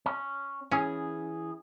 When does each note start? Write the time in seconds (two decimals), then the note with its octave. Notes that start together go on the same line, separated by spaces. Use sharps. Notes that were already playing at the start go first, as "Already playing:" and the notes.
0.06 C#4
0.71 E3 C#4 G#4